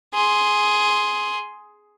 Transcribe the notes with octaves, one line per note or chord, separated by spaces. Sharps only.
G#4 C6